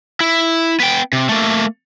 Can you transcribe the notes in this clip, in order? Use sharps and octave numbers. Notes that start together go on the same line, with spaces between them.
E4
B3 G5
C3
A3 A#3